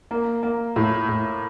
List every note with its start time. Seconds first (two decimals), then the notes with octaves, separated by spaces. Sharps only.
0.11 A#3
0.43 A#3
0.76 A2
1.09 A2